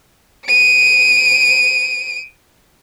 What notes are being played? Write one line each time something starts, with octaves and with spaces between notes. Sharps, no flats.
D7 D#7